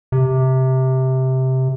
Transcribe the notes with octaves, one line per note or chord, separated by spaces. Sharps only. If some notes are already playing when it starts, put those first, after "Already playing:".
C3